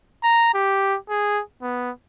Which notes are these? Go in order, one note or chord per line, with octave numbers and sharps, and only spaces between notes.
A#5
G4
G#4
B3